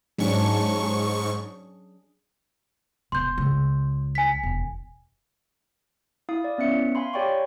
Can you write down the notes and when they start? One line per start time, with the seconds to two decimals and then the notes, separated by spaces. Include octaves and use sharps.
0.18 G#2 F#3 C#4 D4 C#6
0.83 G#4
3.12 E1 C6 G6
3.38 C#2
4.15 G#5 B6
4.43 E1
6.29 E4 F5 D#6
6.44 D5
6.58 B3 C#4 E5 C#7
6.95 F5 G#5 B5 C6
7.13 G4 C#5 D5 G5 B5 C#6